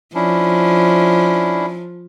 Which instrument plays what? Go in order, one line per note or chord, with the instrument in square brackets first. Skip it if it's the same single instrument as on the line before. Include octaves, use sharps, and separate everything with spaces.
[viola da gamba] F3 [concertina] C#4 D4 E4